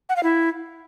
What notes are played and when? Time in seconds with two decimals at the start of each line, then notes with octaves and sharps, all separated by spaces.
0.09 F#5
0.16 F5
0.23 E4